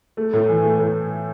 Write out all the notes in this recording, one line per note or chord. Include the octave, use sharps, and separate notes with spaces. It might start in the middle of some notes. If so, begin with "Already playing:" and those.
A3
A2
E3
A3
A2